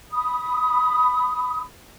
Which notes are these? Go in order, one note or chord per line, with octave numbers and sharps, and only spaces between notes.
B5 D#6